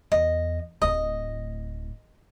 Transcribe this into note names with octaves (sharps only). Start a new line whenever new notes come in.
E2 D#5
D1 A2 D#5